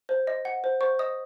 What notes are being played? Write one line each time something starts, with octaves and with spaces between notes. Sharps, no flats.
C5
D#5
F#5
C5
C5 C#6
D#5 D#6